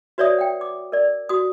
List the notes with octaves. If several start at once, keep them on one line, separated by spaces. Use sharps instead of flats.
F#4 B4 C#5 D5 E5 D#6
F#5 G5
D6
A#4 D5
F#4 D#6